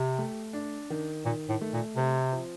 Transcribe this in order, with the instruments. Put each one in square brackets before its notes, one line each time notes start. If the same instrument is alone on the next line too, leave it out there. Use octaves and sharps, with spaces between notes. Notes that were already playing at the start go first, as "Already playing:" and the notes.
Already playing: [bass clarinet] C3 [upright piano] G4
[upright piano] A3
D4
D#3
[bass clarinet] A#2 [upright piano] D#3
[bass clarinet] A2
[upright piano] A3
[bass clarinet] A#2
[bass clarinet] C3 [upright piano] C4
[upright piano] F3